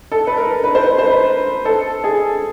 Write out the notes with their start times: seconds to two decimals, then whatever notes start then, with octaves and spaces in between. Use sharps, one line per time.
0.12 A4
0.27 B4
0.38 A#4
0.64 B4
0.75 C5
0.86 B4
0.98 C5
1.10 B4
1.65 A4
2.04 G#4